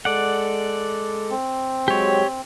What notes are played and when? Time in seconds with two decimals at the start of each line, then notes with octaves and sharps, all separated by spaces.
0.05 G#3 A4 D5 F#5
1.30 C4
1.88 F#3 G#3 G4 C#5